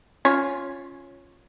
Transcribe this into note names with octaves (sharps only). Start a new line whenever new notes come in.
C#4 F4 C#5